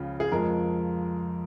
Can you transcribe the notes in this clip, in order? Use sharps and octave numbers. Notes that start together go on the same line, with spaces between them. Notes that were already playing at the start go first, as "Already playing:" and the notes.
Already playing: C#2 C#3 F3 F4
G#4
F2 F3 G#3 A#4